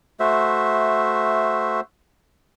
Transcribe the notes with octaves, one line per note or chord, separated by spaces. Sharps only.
A3 F#4 C5 E5